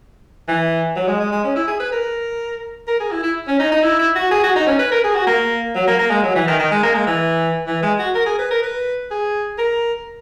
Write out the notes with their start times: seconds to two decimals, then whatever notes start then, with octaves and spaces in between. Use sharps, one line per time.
0.48 E3
0.96 F#3
1.07 G#3
1.20 G#3
1.32 G#3
1.44 C#4
1.56 E4
1.68 G#4
1.80 B4
1.92 A#4
2.88 A#4
3.00 G#4
3.11 E4
3.23 E4
3.47 C#4
3.59 D#4
3.72 D#4
3.83 E4
3.99 E4
4.15 F#4
4.31 G#4
4.43 F#4
4.56 D#4
4.67 C#4
4.79 B4
4.92 A#4
5.04 G#4
5.15 F#4
5.27 A#3
5.75 F#3
5.87 A#3
5.99 A#3
6.10 G#3
6.23 F#3
6.35 E3
6.47 D#3
6.59 D#3
6.71 G#3
6.83 A#3
6.95 G#3
7.07 E3
7.67 E3
7.82 G#3
7.99 F#4
8.15 A#4
8.26 G#4
8.39 B4
8.51 A#4
8.63 B4
9.11 G#4
9.58 A#4